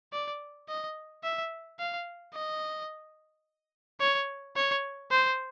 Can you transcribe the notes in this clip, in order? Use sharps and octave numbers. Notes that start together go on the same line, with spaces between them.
D5
D#5
E5
F5
D#5
C#5
C#5
C5